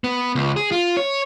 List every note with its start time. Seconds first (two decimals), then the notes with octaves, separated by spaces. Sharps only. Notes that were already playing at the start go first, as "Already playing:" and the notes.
0.04 B3
0.35 C#2
0.56 G#4
0.72 F4
0.97 C#5